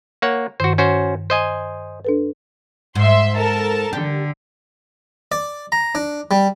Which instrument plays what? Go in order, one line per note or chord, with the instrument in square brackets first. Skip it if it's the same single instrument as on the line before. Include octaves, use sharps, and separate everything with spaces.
[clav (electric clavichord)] A#3 C#5 F#5
[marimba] G2 D#3 [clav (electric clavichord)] F#4 C5
[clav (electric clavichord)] C#4 F#4 C5
C5 D#5 G#5
[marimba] D4 A4 B4
[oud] G#2 [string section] E5 C6
[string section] A4 A#4 A5
[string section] D3 [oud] G4
[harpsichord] D5
A#5
D4
G3